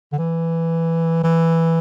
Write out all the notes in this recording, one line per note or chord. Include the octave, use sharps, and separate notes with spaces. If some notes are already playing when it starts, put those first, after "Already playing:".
D3
E3
E3